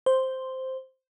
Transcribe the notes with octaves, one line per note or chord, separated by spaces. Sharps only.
C5